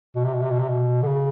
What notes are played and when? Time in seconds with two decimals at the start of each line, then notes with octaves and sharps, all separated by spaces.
0.16 B2
0.24 C3
0.33 B2
0.42 C3
0.50 B2
0.59 C3
0.68 B2
1.02 D3
1.07 C#3